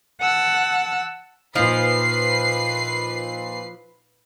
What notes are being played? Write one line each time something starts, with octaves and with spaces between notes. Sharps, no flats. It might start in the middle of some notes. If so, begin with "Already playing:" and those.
F#5 A5 E6 F#6
A#2 F3 D#4 B4 C7